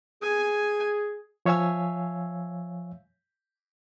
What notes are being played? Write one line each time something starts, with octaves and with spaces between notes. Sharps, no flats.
G#4 G#5
F3 C#5 E5 F5 G#5 E6